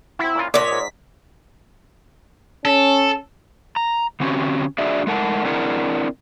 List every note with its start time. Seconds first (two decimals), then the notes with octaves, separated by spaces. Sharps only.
0.19 C4 E4 F#4
0.35 A#2 C#4 F4
0.54 A#2 D3 A3 C#5 D5 B6
0.68 G#2 D#5
2.65 C#4 A4
3.76 A#5
4.20 D3 C4 C#4 F#4 G4
4.78 D4 F#4 G#4 D5 E5
5.07 G#3 A3 D#4 A#4 F#5 A5
5.45 C4 D4 E4 G#4 A#4 F#5